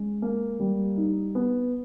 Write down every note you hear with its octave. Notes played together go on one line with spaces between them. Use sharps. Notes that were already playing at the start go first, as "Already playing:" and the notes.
Already playing: G#3 C#4
A#3
G3
D#4
B3